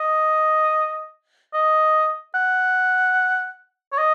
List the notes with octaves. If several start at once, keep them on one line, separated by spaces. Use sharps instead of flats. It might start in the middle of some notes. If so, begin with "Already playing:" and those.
Already playing: D#5
D#5
F#5
C#5
D#5